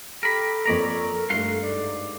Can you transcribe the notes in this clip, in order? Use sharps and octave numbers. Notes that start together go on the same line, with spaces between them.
G4 A4 A#4 B5
F2 A#3 A#4 C#5 D5 A#5 B6
G2 A3 F5 F#5 C6
G#2 D5